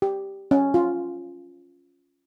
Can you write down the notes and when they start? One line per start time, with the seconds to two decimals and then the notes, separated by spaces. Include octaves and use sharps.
0.02 G4
0.51 C#4
0.74 F4